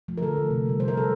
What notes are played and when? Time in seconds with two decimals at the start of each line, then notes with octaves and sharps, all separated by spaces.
0.08 F3 A3
0.18 A#4
0.22 D3 A4
0.36 F3 A3
0.50 C3
0.66 G3 A#3
0.80 C3 C5
0.88 A#4
0.94 G3 A#3 A4